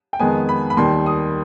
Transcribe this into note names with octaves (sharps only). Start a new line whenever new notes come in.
G5
F2 D#3 G#3 B3 G#5
B5
B5
D#2 D#3 G3 C6
D#6